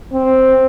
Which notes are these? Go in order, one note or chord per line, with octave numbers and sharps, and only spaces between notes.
C4